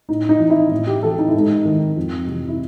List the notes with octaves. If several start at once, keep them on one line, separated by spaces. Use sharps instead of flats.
A2 D#4
D#4
E3
E4
A2
G4
E3 A4
D#4
E4
G#2 D#4
D#3
F2
C3 E3
E4